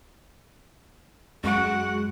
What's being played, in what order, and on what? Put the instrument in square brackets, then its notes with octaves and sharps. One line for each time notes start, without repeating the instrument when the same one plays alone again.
[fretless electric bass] F#2 [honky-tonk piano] G#3 C#6 D7 [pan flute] F#4 [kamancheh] F#5